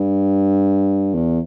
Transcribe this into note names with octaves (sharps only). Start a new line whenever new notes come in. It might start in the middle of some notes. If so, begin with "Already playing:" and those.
Already playing: G2
E2